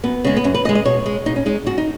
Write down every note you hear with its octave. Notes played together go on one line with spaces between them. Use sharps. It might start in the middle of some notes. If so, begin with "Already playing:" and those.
F#2 B3
C#3 G#3
B3
F#2 C#4
B4
C#3 G#3 D#5
D#5
B2 C#5
G#3
B2 D#4
C#4
G#3 D#4
G#2 F#4
D#4